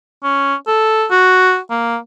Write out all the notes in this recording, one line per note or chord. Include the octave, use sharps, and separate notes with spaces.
C#4
A4
F#4
A#3